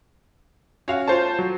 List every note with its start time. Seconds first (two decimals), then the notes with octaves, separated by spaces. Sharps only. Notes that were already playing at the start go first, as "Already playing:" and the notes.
0.88 C#4 F#4 F5
1.08 A3 F4 C5 C#5 A5
1.39 F#3